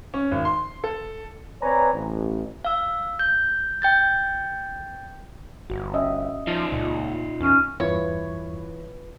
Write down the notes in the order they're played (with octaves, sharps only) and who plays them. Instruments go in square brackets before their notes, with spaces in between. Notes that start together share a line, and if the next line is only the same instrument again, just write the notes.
[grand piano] C#4
G#1
C6
A4
[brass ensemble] C4 B4 C#5 D5 G#5 A#5
A1
[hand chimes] F5 E6
G6
G5 G6 A6
[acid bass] G1 [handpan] F#4
[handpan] C#4 D#5 E5
[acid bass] F3 [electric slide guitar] D#4 F4 D#5
[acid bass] C#2 [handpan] A#2
[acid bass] E2 [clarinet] C#4
[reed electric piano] E2 G2 C#6 [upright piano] E3 [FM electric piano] F4 B4 [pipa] C#5